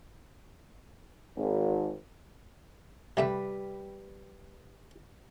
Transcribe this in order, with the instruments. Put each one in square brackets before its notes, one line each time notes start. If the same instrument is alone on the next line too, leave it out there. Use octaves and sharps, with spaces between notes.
[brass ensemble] G#1
[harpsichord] C3 A3 E5 [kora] G3 B4